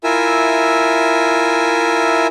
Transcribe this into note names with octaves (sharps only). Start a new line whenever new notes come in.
E4 F4 A#4 E5 G#5 E6